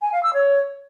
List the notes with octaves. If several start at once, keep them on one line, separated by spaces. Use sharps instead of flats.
G#5
F5
E6
C#5